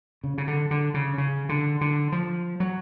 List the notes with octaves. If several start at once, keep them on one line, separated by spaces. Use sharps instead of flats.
C#3
C#3
D3
D3
C#3
C#3
D3
D3
F3
F#3